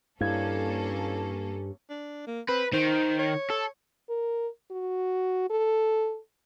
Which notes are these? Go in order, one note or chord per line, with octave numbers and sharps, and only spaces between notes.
G2 A#3 C#4 E4 A4 F5 G#6
D4
A#3
C4 B4
D#3 C5
C#5
A4
A#4
F#4
A4